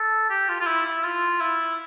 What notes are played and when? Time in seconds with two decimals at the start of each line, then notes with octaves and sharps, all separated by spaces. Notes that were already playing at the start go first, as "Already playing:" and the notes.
Already playing: A4
0.30 G4
0.49 F4
0.60 F4
0.66 E4
0.85 E4
1.04 F4
1.40 E4